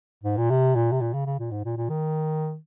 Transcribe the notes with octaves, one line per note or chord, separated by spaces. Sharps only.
G#2
A#2
C3
A#2
C3
A#2
C#3
C#3
A#2
G#2
A#2
A#2
D#3